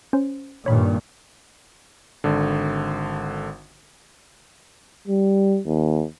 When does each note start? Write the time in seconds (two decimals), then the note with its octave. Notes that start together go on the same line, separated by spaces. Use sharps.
0.13 C#4 C5
0.66 G2 A#2 D#3 C#5 B5
2.24 G#1 D3
5.08 G3
5.66 D#2